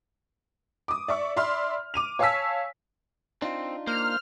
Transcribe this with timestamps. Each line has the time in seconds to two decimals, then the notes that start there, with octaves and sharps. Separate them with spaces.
0.88 D6 D#6
1.08 D5 E5 C#6
1.36 D5 E5 B5 C6 F6
1.94 D6 D#7 F7
2.19 C#5 F5 G#5 A5 E6 B6
3.42 C4 D4 D#4 F4
3.87 A#3 C5 F6